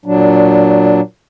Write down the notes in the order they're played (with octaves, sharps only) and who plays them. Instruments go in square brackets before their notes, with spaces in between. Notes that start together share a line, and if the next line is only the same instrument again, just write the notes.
[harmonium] A#2 F#3 D4